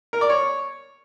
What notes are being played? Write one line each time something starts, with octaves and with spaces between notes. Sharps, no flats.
A#4
D5
C#5